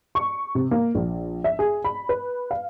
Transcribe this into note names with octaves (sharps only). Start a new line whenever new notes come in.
C#6
C3
A#3
A#1
E5
G#4
B5
B4
F5